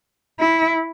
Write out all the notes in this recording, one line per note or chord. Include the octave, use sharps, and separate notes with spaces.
E4